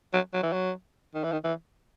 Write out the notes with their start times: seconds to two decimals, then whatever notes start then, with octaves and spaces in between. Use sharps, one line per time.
0.14 F#3
0.34 F#3
0.43 E3
0.53 F#3
1.14 D#3
1.24 E3
1.32 D#3
1.44 E3